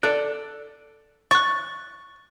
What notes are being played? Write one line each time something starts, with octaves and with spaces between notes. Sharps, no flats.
A4 D5 F#6
C#6 F#6 A6